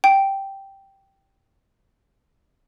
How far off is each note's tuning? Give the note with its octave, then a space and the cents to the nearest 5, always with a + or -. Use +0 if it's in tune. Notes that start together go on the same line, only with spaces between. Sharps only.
G5 -5